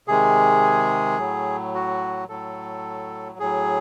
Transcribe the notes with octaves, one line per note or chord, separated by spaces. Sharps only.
C3 D#3 G#3 G#4
A2 F#3
F#4
A2 F#3 A4
A2 F#3 G#4